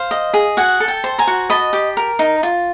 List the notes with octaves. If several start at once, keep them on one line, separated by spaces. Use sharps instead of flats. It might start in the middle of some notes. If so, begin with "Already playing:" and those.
Already playing: C5 F5
D#5
G#4
F#4 F#5 G#5
A4
G5 A5
C5
G#5 A#5
F#4
D#5 A5 B5
G4
A#4
D#4
F4